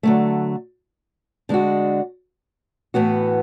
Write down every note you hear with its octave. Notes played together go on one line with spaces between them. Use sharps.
D3 F#3 A3
D3 G#3 D4 F#4
A2 E3 B3 F#4